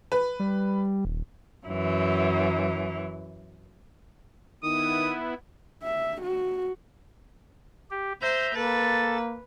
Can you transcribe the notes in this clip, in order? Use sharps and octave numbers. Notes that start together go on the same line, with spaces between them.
B4
G3
D#1
F#2 E3
D#3 B3 E4 D#6
E5
F#4
G4
C5 E5 A#5 G6
A#3 A4 B4 A6